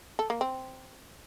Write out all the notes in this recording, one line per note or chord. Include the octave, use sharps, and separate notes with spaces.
A4
A#3
C4